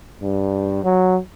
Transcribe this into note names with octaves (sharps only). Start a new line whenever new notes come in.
G2
F#3